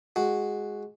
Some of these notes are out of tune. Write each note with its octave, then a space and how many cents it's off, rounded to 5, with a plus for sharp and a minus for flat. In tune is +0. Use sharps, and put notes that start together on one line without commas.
G#3 +0 F#4 +0